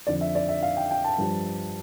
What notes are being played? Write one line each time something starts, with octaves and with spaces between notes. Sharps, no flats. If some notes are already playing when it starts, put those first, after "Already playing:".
F2 D3 F3 D5
E5
D5
E5
F5
G5
G5
A5
G2 F3